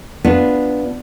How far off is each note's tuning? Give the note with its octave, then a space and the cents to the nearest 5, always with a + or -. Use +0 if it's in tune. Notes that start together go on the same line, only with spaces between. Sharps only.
B3 +0 D4 +0 F4 +0